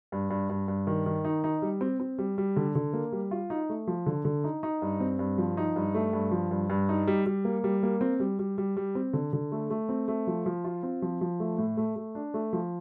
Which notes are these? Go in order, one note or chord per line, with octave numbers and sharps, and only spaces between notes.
G2
G2
G2
G2
D#3
D#3
D#4
D#4
G3
C4
C4
G3
G3
D3
D3
A#3
G3
F4
D#4
A3
F3
D3
D3
D#4
D#4
G2
C4
G2
F3
D#4
G2
A3
G2
F3
G2
G2
D#4
G3
G3
A#3
G3
A#3
C4
G3
G3
G3
G3
C4
D3
D3
A3
A3
C4
A3
F3
F3
F4
C4
F3
F3
A3
A2
A3
A3
D4
A3
F3